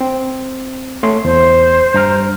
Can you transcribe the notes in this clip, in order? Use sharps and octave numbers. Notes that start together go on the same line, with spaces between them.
C4
A3 C#5 C6
E2 C5
G2 A#5 F6